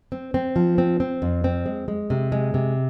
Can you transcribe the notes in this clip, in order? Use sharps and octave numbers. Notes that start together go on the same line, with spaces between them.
C4
C4
F3
C4
C4
F2
C4
G#3
G#3
C3
G#3
C3